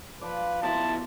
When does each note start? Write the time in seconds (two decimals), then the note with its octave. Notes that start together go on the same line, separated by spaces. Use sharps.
0.21 F3 B4 D5
0.62 B1 B2 E4 A5 A#5 C6